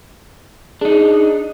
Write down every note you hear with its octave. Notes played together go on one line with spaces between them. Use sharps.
D4 D#4 G#4